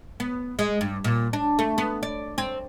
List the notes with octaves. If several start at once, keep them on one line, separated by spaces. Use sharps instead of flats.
B3
G#3
G2
A#2
D4
A3
B3
D5
C4